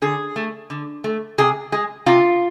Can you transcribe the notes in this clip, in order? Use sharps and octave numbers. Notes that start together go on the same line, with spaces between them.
D3 G#4
A3
D3
A3
C3 G#4
G#3 G#4
C3 F4